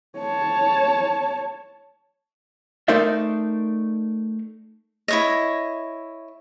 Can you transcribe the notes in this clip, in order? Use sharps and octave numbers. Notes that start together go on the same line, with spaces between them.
C#5 A5
A3 D#4 A#4 C5 D5 E5
E4 C#5 D#5